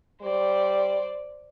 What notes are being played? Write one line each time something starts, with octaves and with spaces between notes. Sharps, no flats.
G3 C5 D5